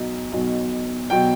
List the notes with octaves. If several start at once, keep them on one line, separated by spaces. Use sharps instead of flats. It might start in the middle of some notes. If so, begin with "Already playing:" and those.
Already playing: B1 B2 F#3
B1 B2 F#3
B2 F#3 G5